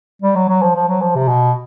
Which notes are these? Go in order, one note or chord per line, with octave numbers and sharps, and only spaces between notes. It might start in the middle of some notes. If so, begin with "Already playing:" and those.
G3
F#3
F#3
F3
F3
F#3
F3
C3
B2